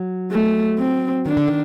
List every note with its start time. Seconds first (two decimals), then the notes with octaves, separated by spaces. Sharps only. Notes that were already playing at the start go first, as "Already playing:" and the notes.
Already playing: F#3
0.32 A3
0.79 C4
1.26 D#3 D4
1.37 D3
1.48 D#3